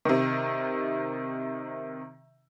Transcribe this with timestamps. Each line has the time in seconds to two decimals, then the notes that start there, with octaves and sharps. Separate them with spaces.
0.05 C3 D#3